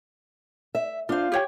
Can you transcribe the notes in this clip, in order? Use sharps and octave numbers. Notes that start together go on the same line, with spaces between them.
E5
D4 F4 C5 F5
G4 C#5 G5